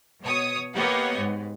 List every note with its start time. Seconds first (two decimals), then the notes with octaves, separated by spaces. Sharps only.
0.22 B2 C#5 D#6
0.76 A#3 B3 G4 C#5 D#5 F#5
1.18 G#2